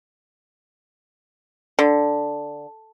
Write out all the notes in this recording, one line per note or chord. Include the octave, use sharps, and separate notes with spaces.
D3